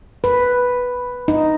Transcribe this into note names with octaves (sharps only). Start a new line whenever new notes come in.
B4
D#4